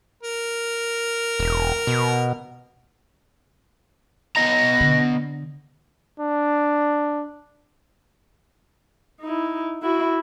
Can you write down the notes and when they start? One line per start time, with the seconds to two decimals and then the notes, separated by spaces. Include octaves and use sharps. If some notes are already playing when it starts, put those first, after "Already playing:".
0.23 A#4
1.40 E1
1.87 B2
4.36 B3 D#5 A#5 A#6
4.81 D3
6.20 D4
9.21 D#4 E4
9.82 E4 F#4